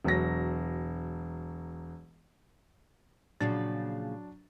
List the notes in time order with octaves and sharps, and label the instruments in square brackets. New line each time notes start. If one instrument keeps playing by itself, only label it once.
[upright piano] E1 F#3 A#6
[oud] A#2 C#3 F3 [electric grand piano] F#3 D4 A6